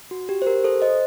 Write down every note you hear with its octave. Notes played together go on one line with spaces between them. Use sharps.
F#4
G4
C5
G4 A#4
A4 C5
C5 D#5